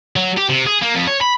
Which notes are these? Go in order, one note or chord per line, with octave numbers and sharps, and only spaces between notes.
F#3
G4
C3
G#4
A#3
F2
C#5
B5